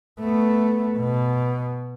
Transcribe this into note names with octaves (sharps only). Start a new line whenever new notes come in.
A3 B3
B2